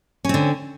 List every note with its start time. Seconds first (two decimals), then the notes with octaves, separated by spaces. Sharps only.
0.25 C#4
0.29 C4
0.34 D3